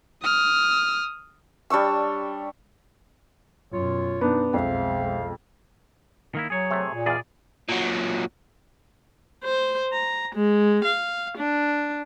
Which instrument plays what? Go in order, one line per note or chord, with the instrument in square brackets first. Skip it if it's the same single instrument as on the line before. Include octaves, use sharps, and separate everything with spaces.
[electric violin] D#6 F6
[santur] G3 D4 C#6 E6
[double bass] F#2 B2 [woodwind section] F4 C#5
[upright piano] B3 D4 [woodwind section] D#4
[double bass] B1 G#3 [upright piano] F2 [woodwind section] C5 E5 F5
[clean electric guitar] D#3 A#3 E4
[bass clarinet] F#3 [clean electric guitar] G#4 C#5
[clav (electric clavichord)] C3 A3
[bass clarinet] A#2
[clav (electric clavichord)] E2 F5 [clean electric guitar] G#4 D5
[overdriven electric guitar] A#2 F#3
[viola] C5
A#5
G#3
F5
D4